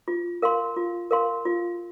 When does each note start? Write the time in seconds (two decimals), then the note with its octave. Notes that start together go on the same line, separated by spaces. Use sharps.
0.08 F4
0.42 A#4 F5 C6
0.76 F4
1.11 A#4 F5 C6
1.45 F4